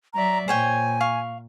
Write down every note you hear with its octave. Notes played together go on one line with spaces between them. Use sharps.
F#3 D5 E5 A#5
A#2 C5 C#5 G5 G#5
F5 C#6